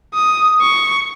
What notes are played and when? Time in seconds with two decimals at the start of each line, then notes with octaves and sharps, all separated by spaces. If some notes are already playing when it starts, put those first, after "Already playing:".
0.14 D#6
0.61 C#6